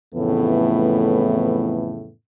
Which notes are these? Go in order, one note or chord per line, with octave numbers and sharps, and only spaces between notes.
F2 A2 C#3 E3 A3 B3